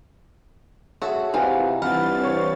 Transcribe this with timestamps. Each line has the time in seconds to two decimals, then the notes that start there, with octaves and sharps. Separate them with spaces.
1.02 F#4 G#4 A4 C#5 E5
1.34 C3 E3 D#4 F4 F5 F#5
1.82 G2 E3 C4 F#5 B5 F6 A6
2.22 C5 C#5 C#6